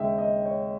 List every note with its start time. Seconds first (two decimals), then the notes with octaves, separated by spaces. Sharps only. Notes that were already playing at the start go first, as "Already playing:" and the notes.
Already playing: D#2 C#3 G#3 D#5 E5 G5
0.18 D#5
0.45 C#5